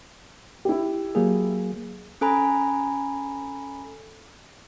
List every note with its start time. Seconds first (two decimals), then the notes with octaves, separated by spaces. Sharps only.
0.65 E4 G4
1.15 F#3 A#3 G#4
2.21 C#4 A4 G#5 A#5 B5